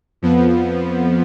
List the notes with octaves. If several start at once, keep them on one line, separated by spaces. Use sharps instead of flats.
F2 F3 B3